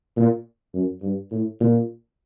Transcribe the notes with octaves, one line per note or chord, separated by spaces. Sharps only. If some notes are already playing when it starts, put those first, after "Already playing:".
A#2
F#2
G2
A2
A#2